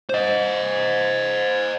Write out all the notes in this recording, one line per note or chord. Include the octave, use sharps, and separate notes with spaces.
C5 D#5